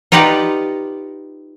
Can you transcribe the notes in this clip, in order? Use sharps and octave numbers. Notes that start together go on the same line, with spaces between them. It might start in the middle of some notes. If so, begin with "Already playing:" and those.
D#4 F4 G4 B4 D5 F#5